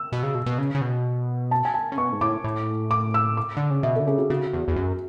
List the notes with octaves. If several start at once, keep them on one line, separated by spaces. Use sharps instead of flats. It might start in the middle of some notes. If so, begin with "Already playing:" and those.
Already playing: E6
B2
C#3
B2
B2
C#3
C#3
B2
A5
G#5
A5
C#3
B2 C#6
G#2
A2 D6
A2
D6
E6
D6
D3
C#3
B2 E5
A4
D3
C#3 G#4
F#4
C#3 F#4
E2
E2
F#2